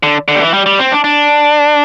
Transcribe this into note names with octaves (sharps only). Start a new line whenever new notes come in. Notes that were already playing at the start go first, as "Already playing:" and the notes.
D3
D3
G3
E3
G3
G3
C4
D4
D4